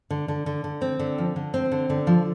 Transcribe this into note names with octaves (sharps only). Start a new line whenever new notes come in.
D3
D3
D3
D3
C4
D3
F3
D3
C4
D3
D3
F3